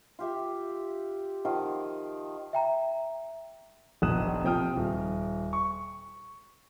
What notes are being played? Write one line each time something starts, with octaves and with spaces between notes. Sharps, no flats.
F4 G4 E5
D#3 F3 F5 F#5
E5 G5 A#5
F1 A#1 B2 D#6 F#6 E7
C3 F3 G5 D#6 F6
D#1
C#6